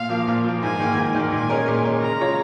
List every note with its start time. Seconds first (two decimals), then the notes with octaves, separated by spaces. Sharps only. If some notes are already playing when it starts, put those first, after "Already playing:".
Already playing: A#2 F5
0.09 F3 A#3
0.27 A#2
0.44 F3 A#3
0.63 G#2 G#5
0.79 D#3 A#3
0.97 G#2
1.15 D#3 A#3
1.32 A#2 G#5
1.50 G#3 C#4 A#4
1.68 A#2
1.84 G#3 C#4 A#4
2.01 C#3 A#5
2.20 G#3 F4 C#5